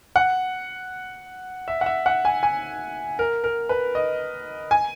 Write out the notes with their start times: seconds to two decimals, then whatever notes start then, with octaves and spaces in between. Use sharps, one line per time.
0.16 F#5
1.68 E5
1.81 F#5
1.86 E5
2.06 F#5
2.25 G#5
2.43 G#5
3.19 A#4
3.44 A#4
3.69 B4
3.95 D#5
4.71 G#5